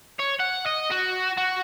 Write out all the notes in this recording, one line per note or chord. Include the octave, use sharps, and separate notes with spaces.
C#5
F#5
D#5
F#4
F#4